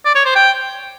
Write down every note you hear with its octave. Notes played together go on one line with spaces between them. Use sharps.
D5
C#5
C5
G5